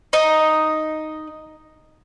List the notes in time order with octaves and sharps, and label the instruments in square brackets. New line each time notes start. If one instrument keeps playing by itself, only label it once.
[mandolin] D#4 D#5